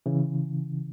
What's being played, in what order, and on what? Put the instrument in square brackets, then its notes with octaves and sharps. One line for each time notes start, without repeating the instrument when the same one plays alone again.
[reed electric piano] C#3 E3